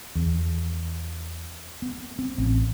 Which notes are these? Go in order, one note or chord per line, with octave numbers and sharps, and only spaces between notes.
E2
B3
C4
A1